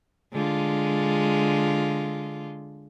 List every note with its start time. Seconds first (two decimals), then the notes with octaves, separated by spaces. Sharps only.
0.33 D3 G#3 F4